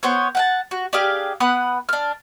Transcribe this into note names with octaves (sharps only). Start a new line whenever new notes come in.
B3 C5 C#5
F#5 G5 A5
F#4
D4 G4 G#4 F5
B3 B5 D#6 F#6
D4 F6